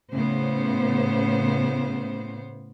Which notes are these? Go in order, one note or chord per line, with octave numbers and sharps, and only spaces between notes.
A2 C#3 B3 C5